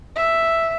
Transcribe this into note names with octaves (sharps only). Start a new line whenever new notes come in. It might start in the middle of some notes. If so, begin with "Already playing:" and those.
E5